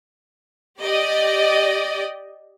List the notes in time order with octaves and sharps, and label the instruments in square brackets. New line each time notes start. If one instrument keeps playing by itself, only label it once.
[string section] G4 D5 D#5